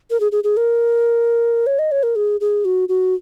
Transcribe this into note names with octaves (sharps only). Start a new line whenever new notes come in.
A#4
G#4
G#4
G#4
A#4
C#5
D#5
C#5
A#4
G#4
G#4
F#4
F#4